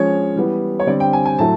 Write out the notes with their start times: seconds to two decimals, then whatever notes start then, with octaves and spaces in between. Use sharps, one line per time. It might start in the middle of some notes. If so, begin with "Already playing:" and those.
Already playing: F3 G#3 C#4 C#5
0.36 E3 G3 B3
0.80 C#5
0.87 D3 G3 C4 D5
1.00 G5
1.13 G#5
1.26 G#5
1.39 A2 F#3 A3 A5